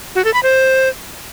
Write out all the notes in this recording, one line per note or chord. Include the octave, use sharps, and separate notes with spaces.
F#4
A4
B5
C5